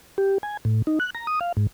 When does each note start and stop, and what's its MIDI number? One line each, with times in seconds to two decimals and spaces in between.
0.18 0.38 67
0.43 0.57 80
0.65 0.82 45
0.87 0.99 63
1.00 1.10 90
1.15 1.27 82
1.27 1.40 87
1.41 1.52 77
1.57 1.67 44